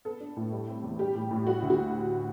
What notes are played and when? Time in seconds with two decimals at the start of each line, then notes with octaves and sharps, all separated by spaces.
0.05 B3 A4
0.20 D4
0.36 A2
0.52 G3
0.68 C4
0.84 E2
0.99 G3 G4
1.15 A2
1.31 A2
1.47 G3 F#4
1.62 D2
1.70 F#4